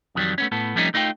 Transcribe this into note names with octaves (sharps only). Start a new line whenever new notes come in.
F2 D#3 F#3 G3
A3 B3 C#4
A2 B3 A4
F3 G3 A3 C4 C#4 D#4
A3 D#4 F4 A#4 G5